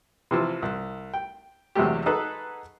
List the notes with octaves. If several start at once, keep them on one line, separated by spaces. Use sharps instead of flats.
C3 E3 F3
C2
G5
E2 C3 F#3 G#3 A3 G4
D#4 F#4 G#4 A4 B4